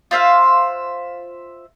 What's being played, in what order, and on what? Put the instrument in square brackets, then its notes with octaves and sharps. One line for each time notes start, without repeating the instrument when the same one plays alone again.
[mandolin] F4 C5 E5 F5